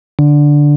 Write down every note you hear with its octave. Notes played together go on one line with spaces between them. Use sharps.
D3